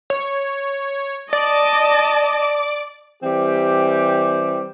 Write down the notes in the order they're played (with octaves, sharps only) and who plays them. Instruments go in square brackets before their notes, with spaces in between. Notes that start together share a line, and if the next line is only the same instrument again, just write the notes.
[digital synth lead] C#5
[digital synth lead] D5 [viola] D#5 A5
[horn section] E3 G3 C4 G4